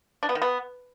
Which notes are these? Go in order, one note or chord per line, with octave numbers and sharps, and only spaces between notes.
D4
B3
D#3
B3